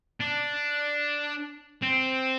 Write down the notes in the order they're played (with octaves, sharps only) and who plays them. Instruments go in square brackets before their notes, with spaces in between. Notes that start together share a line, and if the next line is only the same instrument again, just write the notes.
[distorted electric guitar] D4
C4